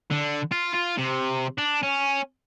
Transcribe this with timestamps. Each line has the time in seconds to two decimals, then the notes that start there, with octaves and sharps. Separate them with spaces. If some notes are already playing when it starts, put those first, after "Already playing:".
0.11 D3
0.52 F4
0.74 F4
0.97 C3
1.58 D4
1.83 C#4